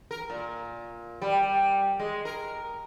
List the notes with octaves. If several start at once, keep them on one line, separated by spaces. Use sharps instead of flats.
A#4
A#2
G3
G#3
A#4